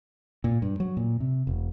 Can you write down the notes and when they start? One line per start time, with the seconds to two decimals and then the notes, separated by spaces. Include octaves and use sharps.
0.44 A#2
0.62 G2
0.80 F#3
0.97 A#2
1.20 C3
1.47 E1